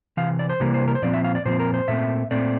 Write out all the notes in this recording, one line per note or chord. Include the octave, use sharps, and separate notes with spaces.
C3 E3 F5
D5
C5
C3 E3 G3 A#3
C5
A#4
C5
A#2 F3 C4 D5
E5
F5
D5
A#2 F3 C4 C5
A#4
C5
A#2 A3 C4 E5
A#2 A3 C4 D5